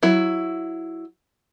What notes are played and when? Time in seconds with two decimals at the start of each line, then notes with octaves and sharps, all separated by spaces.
0.03 F#3 E4